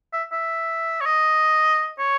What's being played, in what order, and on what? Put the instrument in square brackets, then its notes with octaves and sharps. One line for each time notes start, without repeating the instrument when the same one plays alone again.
[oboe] E5
E5
C#5
D#5
C#5